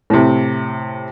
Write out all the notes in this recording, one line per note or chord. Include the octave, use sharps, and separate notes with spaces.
A2 C3